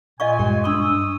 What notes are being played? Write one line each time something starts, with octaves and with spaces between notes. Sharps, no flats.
A#2 D#5 F5 G#5 C#6
G2 G#3 G4
D4 C6 C#6 D#6 E6